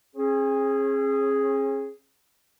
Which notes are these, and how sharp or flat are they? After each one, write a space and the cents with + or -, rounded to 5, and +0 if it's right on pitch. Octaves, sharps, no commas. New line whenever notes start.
C#4 -45 G#4 +0